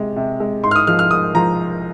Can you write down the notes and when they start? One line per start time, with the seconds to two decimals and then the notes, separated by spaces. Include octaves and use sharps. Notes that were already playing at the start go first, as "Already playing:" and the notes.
Already playing: C3 G#3
0.16 C3
0.40 G#3
0.63 G#2 C6
0.71 F6
0.75 D#6
0.87 F3 G#3 F6
0.99 F6
1.11 G#2 D#6
1.34 F3 G#3 A#5